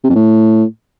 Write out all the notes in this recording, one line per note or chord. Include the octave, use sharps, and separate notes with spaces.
C3
F2
A2